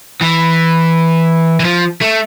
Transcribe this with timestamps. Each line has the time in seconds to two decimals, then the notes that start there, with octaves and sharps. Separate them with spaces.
0.21 E3
1.60 E3
1.65 F3
2.01 A3